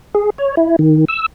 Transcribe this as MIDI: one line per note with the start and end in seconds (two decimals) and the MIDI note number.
0.15 0.30 68
0.38 0.55 73
0.57 0.76 64
0.79 1.05 51
1.08 1.26 88